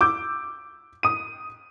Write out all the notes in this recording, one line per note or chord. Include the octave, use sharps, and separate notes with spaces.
D6 E6 G6
D#6 D#7